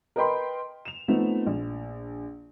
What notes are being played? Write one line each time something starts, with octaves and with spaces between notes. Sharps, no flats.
A#4 B4 D#5 G5 B5 C6
E7 F7
F3 A3 B3 C4 D#4
A#1